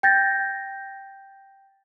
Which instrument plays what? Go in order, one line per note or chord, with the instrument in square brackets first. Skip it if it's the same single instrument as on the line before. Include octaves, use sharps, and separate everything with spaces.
[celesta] G5 G6 A6 A#6